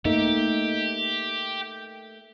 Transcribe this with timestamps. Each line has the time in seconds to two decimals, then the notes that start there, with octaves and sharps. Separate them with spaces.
0.05 A3 A#3 D#4 G4